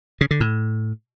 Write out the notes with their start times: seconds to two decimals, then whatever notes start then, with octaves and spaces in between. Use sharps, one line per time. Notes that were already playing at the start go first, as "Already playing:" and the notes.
0.21 C#3
0.31 D3
0.40 A2